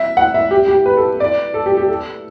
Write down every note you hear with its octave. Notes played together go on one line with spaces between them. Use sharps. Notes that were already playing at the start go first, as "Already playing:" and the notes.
Already playing: E5
F#5
E5
G4
G4
B4
A4
D5
A4
G4
G4
A4